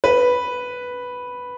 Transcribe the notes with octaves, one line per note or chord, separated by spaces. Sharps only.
B4